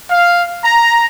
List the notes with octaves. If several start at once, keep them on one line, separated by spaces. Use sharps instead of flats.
F5
A#5